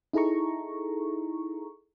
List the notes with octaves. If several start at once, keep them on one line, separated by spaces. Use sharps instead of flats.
D#4 E4 G#4 A4 A#5 C#6